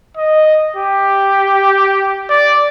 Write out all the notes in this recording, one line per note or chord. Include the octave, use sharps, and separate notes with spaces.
D#5
G4
D5